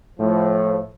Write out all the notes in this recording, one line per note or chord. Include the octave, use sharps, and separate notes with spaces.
A2 F3